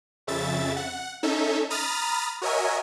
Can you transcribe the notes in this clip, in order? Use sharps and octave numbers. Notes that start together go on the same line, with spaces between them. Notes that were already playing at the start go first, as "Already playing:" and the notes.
F2 C#3 E5 A6
F#5
C#4 D#4 A4 E5
A#5 B5 D#6 F6 A6
F#4 A#4 C#5 D#5 E5 G#5